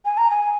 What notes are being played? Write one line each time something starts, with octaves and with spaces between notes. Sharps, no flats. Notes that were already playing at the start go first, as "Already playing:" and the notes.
G#5
A#5
G#5